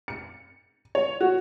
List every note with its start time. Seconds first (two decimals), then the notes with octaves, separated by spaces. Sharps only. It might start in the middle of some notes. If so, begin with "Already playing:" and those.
0.08 C#7
0.95 C#5
1.21 F#4